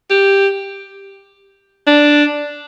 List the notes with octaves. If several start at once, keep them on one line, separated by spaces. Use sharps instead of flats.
G4
D4